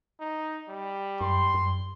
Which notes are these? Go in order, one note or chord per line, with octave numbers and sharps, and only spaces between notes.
D#4
G3
F#2 C6
F#2